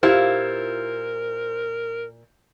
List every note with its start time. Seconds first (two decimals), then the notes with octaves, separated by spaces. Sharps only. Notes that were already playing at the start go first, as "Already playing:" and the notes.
0.03 A#2 E4 F4 G4 A#4 C5